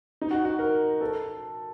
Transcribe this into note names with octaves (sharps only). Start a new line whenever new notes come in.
D#4
F#4
F#4
A#4
A4